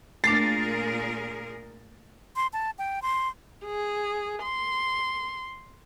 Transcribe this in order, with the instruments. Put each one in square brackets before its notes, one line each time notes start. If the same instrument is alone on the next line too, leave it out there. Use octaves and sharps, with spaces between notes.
[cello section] A#2 G#4 A#4 [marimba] A3 D4 [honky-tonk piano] A6 [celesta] C7
[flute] C6
A5
G5
C6
[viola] G#4
C6